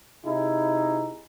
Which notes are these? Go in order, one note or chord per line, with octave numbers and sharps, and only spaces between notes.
C3 D#4 E4 G#4